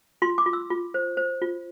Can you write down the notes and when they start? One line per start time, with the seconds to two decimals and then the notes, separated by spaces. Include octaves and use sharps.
0.22 F4 C6
0.38 D6
0.46 F4
0.53 E6
0.70 F4
0.94 C5
1.17 C5
1.42 F4